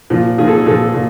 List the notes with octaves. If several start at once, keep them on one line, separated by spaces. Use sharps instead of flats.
A#2 F3
A#2 F3 G#4
A4
G#4
A#2 F3 A4
A#2